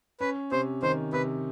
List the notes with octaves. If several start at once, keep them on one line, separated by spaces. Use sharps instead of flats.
C#4 B4
C3 C5
D#3 C5
C3 B4